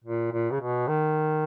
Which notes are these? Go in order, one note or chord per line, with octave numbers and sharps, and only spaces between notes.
A#2
A#2
C#3
B2
D#3